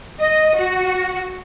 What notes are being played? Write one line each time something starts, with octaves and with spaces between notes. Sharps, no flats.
D#5
F#4